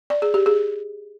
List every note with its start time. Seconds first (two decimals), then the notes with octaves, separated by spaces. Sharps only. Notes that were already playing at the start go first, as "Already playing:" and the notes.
0.10 D5
0.22 G#4
0.34 G4
0.46 G#4